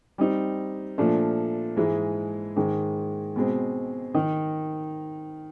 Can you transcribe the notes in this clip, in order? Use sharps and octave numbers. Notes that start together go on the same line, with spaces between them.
G3 C4 D#4
A#2 F3 A3 D4
G#2 E3 G#3
G#2 D#3 G#3
B2 G#3 C4
D#3 D#4